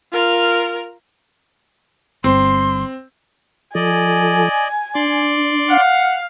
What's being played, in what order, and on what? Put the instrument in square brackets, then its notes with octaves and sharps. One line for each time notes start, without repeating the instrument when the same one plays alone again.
[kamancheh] F4 A#4
[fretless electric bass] G1 G2 [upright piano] C4 [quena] C6
[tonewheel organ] F3 A4 [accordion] D5 D#5 [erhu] G#5
[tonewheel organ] D4 [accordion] D5 C6 D6
[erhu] F5 [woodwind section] F#5